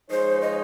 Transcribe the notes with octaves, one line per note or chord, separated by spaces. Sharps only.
F3 G#3 D#4 G#4 C5 C#5
D#5